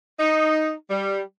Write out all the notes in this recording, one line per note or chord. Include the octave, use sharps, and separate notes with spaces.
D#4
G3